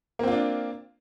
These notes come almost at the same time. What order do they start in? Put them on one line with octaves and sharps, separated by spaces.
A#3 C4 F4 D4